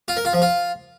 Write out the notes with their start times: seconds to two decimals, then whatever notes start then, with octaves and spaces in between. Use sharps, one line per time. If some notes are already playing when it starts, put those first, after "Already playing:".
0.08 F4
0.17 A#4
0.25 F4
0.33 F3
0.42 F4